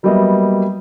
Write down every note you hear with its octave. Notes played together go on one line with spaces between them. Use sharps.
F#3 G3 A#3 B3 D#5 E5